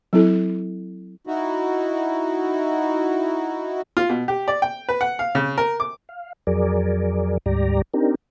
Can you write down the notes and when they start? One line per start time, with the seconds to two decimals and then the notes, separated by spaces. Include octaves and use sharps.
0.13 F#3 C4 E4 A4
1.27 D#4 E4 F#4
3.97 F4
4.09 B2
4.28 G4
4.48 D5
4.62 G5
4.89 B4
5.01 F#5
5.19 F5
5.35 C#3
5.58 A#4
5.80 D6
6.09 F5
6.47 F2 F#3 G#4 A#4 D5
7.46 D2 G#2 G3 G4 D5 A#5
7.94 C4 D4 D#4 G4 A#4